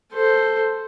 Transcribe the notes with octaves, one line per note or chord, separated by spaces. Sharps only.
A4 C5